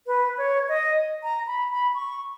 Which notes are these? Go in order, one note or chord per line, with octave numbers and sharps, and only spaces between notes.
B4
C#5
D#5
A#5
B5
B5
C#6